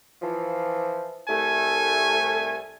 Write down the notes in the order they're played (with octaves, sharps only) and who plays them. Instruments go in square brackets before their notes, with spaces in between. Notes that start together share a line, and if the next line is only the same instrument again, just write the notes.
[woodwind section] E3 F3
[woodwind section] C2 A3 [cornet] G#5